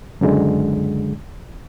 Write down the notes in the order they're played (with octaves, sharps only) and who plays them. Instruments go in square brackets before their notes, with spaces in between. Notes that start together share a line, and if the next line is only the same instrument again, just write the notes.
[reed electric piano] C#2 F#2 D3 G#3